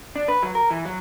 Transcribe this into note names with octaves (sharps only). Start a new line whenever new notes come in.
D4
B4
F#3
A#4
E3
F#3